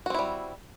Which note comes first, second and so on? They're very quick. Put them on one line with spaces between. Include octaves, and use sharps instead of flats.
F#4 C4 E4 G3